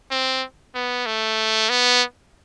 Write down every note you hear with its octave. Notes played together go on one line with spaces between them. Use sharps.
C4
B3
A3
B3